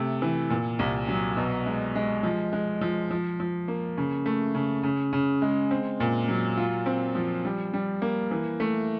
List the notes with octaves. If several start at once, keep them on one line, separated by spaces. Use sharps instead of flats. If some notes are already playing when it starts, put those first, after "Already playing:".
Already playing: C3 A3
E3
A#2
C2
F#3
B2
G#3
G#3
F3
G#3
F3
F3
F3
A#3
C#3
A3
C#3
C#3
C#3
G#3
C4
A#2
F#3
F4
C4
F3
G3
G3
A#3
E3
A3